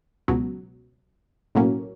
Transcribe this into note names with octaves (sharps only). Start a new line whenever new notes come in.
C#2 B2 F#3
B1 A2 F#3 A#3 C#4